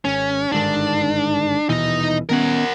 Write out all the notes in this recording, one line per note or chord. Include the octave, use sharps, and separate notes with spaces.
G#1 C#4
G1 G#2 D#3 D4
D#1 B2 E3 D#4 D#5
D#3 B3 C#4 A#4 F#5